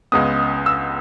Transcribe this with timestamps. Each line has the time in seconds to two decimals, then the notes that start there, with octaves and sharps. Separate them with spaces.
0.12 C#2 C#3 G#3 B3 D#6
0.66 E6